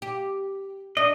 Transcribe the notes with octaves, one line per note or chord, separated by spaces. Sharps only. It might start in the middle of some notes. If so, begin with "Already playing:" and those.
G4
D4 D#5